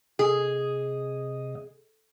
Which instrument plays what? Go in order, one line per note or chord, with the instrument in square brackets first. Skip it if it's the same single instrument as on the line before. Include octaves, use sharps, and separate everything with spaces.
[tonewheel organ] C3 D#5 [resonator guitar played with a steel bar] G#4